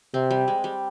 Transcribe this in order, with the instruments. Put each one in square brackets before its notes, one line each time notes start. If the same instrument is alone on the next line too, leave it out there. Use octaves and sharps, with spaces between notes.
[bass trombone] C3 [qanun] C4
[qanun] G3
G#3
G3